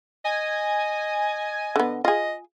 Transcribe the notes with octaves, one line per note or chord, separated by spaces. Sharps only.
D#5 G#5
D3 B3
F4 G#4 D#5